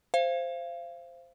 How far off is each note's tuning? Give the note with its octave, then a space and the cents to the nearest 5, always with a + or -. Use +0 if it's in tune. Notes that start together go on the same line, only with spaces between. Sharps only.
C5 +0 F5 -30